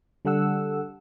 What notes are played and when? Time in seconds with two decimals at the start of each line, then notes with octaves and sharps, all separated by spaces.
0.25 D3 G3 A4 F#5 E6